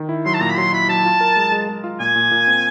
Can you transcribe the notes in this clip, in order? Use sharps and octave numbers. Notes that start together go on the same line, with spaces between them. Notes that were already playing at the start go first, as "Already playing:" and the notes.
Already playing: D#3
E4
F#3 C6
A5
A#2 A#5
B5
F#3 C6
E4 B5
F#3 A5
F4
A#4
G#3
G#3
G#3
F4
A#2 G#5
A#2
A#2
C4